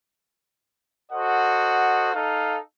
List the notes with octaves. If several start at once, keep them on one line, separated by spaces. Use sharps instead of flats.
F#4 A4 C5 D#5 F#5
D#4 A4 F5